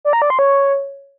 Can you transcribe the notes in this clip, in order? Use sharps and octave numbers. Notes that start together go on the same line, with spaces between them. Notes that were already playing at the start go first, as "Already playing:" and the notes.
D5
A#5
D5
C6
C#5